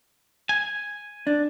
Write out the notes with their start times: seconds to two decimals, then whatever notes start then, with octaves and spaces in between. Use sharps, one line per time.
0.49 G#5
1.27 D4